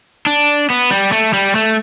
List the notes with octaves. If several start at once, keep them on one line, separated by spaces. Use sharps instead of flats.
D4
B3
G3
A3
G3
A3